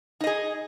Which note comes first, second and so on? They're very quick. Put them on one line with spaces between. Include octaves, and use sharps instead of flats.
D#4 D#5 G#4